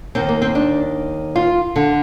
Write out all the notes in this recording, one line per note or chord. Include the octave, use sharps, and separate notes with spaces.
D#2 D#3 C4
A#3
C4
D4
F4
D3